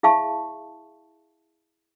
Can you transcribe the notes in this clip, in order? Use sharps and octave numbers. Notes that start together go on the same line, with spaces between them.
E4 G#4 E5 F5 A5 C#6